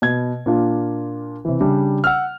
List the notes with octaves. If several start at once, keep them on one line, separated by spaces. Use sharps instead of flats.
B2 G#6
A#2 D4 F4
C3 E3
C#3 G3 D4
F#5 E6 F6